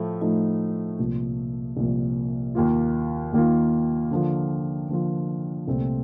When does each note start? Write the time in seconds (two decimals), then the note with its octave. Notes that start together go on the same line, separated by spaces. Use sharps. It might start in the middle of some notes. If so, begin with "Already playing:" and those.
Already playing: A2 F3 A3
0.21 A2 F3 A3 D#4
0.99 C2 A#2 F3
1.77 C2 A#2 F3
2.55 D#2 D#3 A#3 F4
3.33 D#2 D#3 A#3 F4
4.11 D3 F3 A#3 F4
4.89 D3 F3 A#3 F4
5.68 C2 A#2 A3 C4